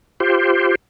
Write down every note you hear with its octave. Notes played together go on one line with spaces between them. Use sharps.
F4 G4 C5